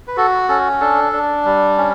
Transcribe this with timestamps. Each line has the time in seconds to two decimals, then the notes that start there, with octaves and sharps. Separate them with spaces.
0.08 B4
0.17 F#4 A4
0.49 C#4 A4
0.81 D4 A4
1.13 D4
1.45 G3
1.77 C#4